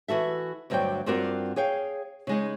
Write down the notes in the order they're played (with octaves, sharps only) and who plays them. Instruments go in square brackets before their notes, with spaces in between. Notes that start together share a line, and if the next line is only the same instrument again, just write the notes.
[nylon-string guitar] E3 F#4 A4 E5
D2 G2 F#3 C5 D5 G5
G2 C4 F4 F#4 A#4 D5
G#4 C#5 F5 G5
C#3 G#3 D#4